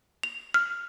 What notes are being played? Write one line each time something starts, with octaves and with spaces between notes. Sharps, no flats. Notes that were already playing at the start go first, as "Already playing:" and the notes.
F7
F6